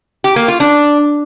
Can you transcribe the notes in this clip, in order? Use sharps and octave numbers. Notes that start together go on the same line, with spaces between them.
G4
A#3
F4
D4